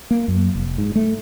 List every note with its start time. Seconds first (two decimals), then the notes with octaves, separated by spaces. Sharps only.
0.11 A#3
0.28 F#2
0.55 F1
0.78 G#2
0.96 A3